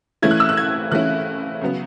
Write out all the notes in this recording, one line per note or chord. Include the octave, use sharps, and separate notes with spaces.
E3 A3 C#4 E4 G#6
F#6
E6
F#6
G#6
E3 A3 C#4 E4 F#6
C#3 F#3 B3